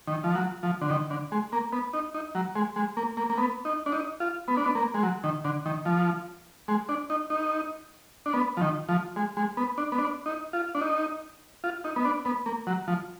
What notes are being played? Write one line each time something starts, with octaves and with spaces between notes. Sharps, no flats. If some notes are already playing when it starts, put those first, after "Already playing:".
D#3
F3
F#3
F3
D3
D#3
D3
G#3
A#3
B3
D#4
D#4
F#3
G#3
G#3
A#3
A#3
A#3
B3
D#4
D4
D#4
F4
B3
D4
B3
A#3
G#3
F#3
D#3
D3
D#3
F3
G#3
D4
D#4
D#4
D4
B3
F3
D#3
F3
G#3
G#3
B3
D4
B3
D4
D#4
F4
D4
D#4
F4
D#4
B3
D4
B3
A#3
F#3
F3